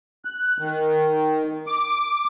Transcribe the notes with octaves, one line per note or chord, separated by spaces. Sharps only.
F#6
D#3
D6